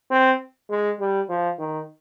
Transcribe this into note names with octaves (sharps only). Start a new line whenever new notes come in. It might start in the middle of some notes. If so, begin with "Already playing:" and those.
C4
G#3
G3
F3
D#3